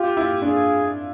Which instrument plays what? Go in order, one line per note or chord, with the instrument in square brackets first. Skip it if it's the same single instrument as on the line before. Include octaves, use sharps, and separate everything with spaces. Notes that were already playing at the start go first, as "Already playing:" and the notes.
Already playing: [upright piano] F4 [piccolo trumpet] G4
[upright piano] E4
[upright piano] D4 [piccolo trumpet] G#4